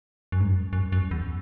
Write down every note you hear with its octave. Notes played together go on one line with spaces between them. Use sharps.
F#2
G#2
F#2
F#2
F#2
E2